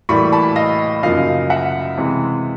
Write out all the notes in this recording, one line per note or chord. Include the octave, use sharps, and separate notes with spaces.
A2 E3 G3 A#3 B5 C#6
A5 B5
D#5 F5
F#2 C#3 F3 A#3 D#4 D#5 F5
E5 F#5
C3 E3 G#3